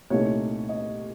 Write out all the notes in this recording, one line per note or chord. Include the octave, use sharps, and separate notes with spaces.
C2 A#2 A3 D#4 C#5
D#5